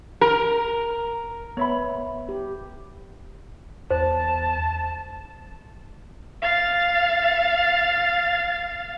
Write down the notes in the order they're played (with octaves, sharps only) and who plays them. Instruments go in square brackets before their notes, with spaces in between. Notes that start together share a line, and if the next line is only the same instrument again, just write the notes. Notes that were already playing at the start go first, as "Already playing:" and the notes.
[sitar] A#4
[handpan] B3 [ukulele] C#5 E5 B5
[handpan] G4
[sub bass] E2 [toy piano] C5 [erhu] A5
[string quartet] F5 A6